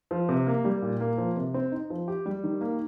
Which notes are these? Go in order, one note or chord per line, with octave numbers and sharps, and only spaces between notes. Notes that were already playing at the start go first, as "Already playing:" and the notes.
F3
C3
A#3
G3
A#2
A#3
F3
C3
C4
D#4
F3
G4
G3
D#3
A#3